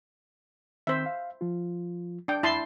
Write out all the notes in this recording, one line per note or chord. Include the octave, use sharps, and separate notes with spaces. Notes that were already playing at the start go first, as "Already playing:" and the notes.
D#3 C4 C5 E5
F5
F3 F4
D4 G5
F2 E4 A5 C6